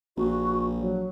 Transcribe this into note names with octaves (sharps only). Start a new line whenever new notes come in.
A#1 F#4
F#3